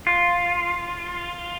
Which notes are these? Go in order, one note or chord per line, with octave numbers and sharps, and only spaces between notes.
F4